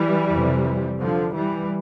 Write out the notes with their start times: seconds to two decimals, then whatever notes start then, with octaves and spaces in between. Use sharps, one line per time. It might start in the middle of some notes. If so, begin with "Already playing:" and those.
Already playing: E3 G3
0.31 F2 C3
0.99 D3 F3
1.34 E3 G3